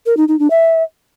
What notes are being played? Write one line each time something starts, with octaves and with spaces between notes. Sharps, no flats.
A#4
D#4
D#4
D4
E5